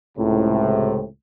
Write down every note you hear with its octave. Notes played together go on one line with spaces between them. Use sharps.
C#2 A2 C3